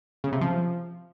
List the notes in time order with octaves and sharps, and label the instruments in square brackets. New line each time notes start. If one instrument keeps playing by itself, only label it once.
[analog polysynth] C#3
C3
F3